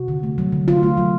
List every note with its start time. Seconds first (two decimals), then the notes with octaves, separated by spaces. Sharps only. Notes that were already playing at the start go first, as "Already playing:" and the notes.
Already playing: C3 F#4
0.08 D3
0.23 A3
0.38 F#3
0.52 D3
0.68 D3 F4
0.83 A3
0.97 F#3